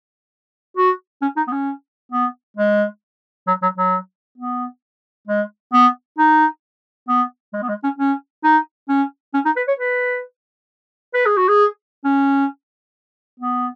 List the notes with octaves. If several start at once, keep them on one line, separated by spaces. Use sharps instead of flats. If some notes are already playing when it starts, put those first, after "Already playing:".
F#4
C#4
D#4
B3
C#4
B3
G#3
F#3
F#3
F#3
B3
G#3
B3
D#4
B3
G#3
B3
G#3
C#4
C#4
D#4
C#4
C#4
D#4
B4
C#5
B4
B4
G#4
F#4
G#4
C#4
B3